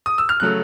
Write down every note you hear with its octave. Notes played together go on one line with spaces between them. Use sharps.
D#6
E6
F6
C#3 F#3 A3 F#6